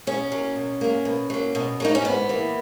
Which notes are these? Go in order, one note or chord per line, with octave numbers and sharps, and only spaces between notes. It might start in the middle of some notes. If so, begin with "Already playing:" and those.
B2 C#4
F#3 A#3
B2
F#3 A#3
B2
F#3 A#3
B2
F#3 A#3 D#4
C#4
G#2 B3
E3 A#3